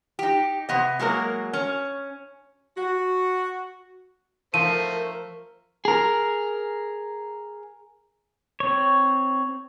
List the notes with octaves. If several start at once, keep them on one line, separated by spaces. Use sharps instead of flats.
D#4 G4
C3 B3 D#5
F#3 G#3 A#3 A#4
C#4
F#4
F3 A3 A#4 C5 D#7
G#4 A#4
C4 C#5